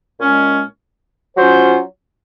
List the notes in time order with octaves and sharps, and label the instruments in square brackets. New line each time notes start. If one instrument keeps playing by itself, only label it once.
[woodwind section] A#2 G#3 C#4
F#3 C#4 F4 C5